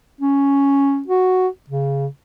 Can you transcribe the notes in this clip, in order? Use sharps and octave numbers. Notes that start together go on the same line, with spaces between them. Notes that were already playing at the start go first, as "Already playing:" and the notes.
C#4
F#4
C#3